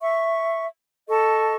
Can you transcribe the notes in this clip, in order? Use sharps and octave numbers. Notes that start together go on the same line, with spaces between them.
E5 C#6
A4 D#5 A5 C#6